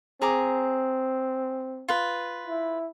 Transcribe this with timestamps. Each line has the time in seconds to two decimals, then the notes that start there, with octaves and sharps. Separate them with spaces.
0.22 C4 G#4 A#5 D6
1.88 F4 B4
2.48 E4